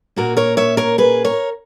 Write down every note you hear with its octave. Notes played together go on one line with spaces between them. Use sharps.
A#2 A#3 C#4 F#4 A#4
A#4 C#5
C#5 E5
A#4 C#5
G#4 B4
A#4 C#5